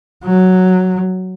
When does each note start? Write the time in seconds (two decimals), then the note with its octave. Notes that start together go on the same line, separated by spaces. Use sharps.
0.24 F#3